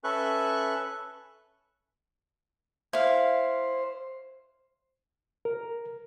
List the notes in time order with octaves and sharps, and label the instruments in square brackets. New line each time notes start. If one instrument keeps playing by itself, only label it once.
[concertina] C#4 A4 B4 E5 C#6 F#6
[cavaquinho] E4 F5 [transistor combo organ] C5
[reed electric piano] A#4